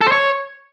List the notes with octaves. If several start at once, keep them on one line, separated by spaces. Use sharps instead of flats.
A4
C5
C#5